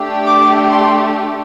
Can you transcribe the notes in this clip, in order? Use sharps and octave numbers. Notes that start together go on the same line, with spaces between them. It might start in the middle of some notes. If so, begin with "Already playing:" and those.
Already playing: A3 D4 G4
D6
C6